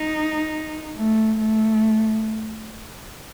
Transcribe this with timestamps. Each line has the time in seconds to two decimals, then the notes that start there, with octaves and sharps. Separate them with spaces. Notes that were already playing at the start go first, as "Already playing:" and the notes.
Already playing: D#4
0.96 A3
1.40 A3